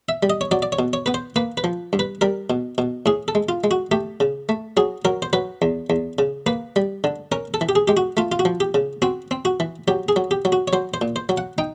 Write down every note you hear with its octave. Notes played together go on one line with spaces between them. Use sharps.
E5
G3
D#5
C#5
F#3 D5
D5
C#5
B2
C#5
B3 B4
C5
A#3 B4
B4
F3
G2
B4
G3 A#4
B2
B2
A2 G#4
A4
G#3
F4
G#3
F#4
A3 G4
C#3
A3
F#3 G#4
F#3 A#4
C5
F#3 B4
E2
E2
C#3
A#3 B4
G3
D3
C#4 A#4
A4
E3
G4
G#4
G#3 G4
F#4
A3 F4
F4
F#4
F3
G4
C#3
C4 F#4
C4
F#4
E3
F#3 G4
G#4
F#3
G4
F#3
F#4
C#5
F#3 C5
C5
A#2
C5
F#3
F#5
D#4 G5